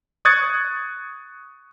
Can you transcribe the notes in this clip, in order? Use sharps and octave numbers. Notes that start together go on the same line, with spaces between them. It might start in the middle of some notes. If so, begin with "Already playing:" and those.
C#6 D#6 F#6 G#6 A6 C#7